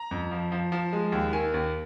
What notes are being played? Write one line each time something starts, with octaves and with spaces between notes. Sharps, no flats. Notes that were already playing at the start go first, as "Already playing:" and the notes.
Already playing: A#5
F2
F3
F3
F3
G#3
D#2
D#3 G#5
D#2